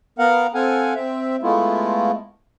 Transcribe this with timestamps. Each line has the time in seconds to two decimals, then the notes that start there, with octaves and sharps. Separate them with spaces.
0.19 B3 A#4 F5 F#5
0.54 C4 A4 F5 F#5 G#5
0.95 C4 E5
1.43 G#3 A3 B3 E4 F4